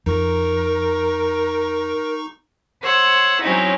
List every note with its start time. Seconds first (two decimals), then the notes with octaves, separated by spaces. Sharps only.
0.06 F2 D#4 A#4 C#6
2.83 C5 C#5 F#5 E6
3.41 F#3 C4 C#4 D#4 E4